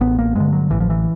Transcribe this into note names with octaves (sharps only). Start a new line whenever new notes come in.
A1 B3
A#3
G2 D3 G#3
F#3
A1 E3
F3
E3